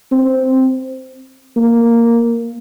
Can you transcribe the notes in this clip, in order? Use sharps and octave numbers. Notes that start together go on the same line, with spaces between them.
C4
A#3